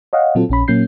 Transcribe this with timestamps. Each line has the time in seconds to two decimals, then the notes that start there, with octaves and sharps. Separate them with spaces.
0.13 C#5 D#5 F5 F#5
0.35 A#2 F#3 C4 F4 A4
0.49 A#1 C#4 B5
0.68 A#2 F#3 A#3 C#4 G6 C7